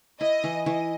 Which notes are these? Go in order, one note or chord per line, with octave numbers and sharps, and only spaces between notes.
E4 D#5
E3
E3 D#5